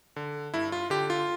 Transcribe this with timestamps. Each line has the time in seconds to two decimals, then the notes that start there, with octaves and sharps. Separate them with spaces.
0.16 D3
0.54 G2 E4
0.72 F4
0.90 D3 G4
1.10 F4